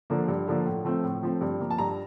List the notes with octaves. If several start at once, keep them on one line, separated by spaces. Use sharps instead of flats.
D3 F3 A#3
G2
D3 F3 A#3
A2
F3 A3 C4
A2
F3 A3 C4
G2
F3 A#3
A5
G2 A#5